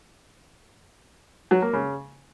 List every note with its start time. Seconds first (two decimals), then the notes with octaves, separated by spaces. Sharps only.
1.51 F#3
1.62 A#3
1.73 C#3